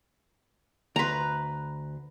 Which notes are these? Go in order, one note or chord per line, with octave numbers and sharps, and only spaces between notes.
D2 B4 A#5 C6